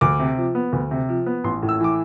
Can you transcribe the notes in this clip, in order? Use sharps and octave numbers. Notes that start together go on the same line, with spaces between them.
D2 D6
C3
F3
B3
D2
C3
F3
B3
A1 C6
A2
E6
E3 D6